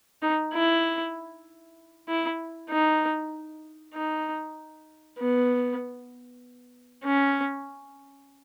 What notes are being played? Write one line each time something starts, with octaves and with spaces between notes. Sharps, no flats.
D#4
E4
E4
D#4
D#4
B3
C#4